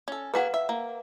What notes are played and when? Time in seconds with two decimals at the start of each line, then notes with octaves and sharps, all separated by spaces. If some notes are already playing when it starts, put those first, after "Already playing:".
0.08 C#4 A4
0.34 A#3 F#4 G#4 B4 F5 F#5
0.54 E5
0.69 A#3